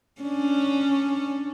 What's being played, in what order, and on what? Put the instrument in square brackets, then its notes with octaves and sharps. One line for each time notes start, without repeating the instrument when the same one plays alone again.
[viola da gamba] C#4 D4